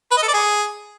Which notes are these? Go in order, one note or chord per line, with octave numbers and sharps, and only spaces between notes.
B4
D#5
A4
D5
G#4